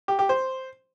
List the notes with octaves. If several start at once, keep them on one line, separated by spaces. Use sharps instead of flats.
G4
G4
C5